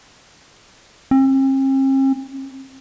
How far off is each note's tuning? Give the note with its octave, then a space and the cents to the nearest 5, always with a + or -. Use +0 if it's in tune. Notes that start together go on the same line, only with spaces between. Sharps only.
C4 +45